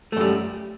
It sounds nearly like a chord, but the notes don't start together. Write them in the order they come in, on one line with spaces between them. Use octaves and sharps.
A3 F#2 G3